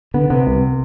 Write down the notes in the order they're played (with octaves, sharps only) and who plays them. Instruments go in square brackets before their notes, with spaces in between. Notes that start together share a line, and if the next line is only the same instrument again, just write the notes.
[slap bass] D3 [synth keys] B3
[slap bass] C3 [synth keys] B3
[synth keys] C2